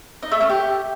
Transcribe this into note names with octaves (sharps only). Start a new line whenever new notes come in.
D#4
A3
C#4
G4